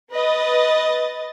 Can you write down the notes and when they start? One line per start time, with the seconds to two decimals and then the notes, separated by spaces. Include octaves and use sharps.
0.13 B4 D#5 A6